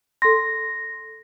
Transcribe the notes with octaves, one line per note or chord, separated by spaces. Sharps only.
A4 C6 A#6